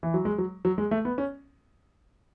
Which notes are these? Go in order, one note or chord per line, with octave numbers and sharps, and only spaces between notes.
E3
F#3
G#3
F#3
F#3
G#3
A3
B3
C#4